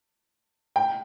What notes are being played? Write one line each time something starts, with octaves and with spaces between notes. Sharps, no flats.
G5